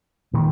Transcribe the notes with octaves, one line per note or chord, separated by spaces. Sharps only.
A#2 D#3